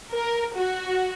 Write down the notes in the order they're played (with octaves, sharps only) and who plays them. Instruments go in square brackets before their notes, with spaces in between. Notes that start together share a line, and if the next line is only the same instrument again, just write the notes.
[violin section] A#4
F#4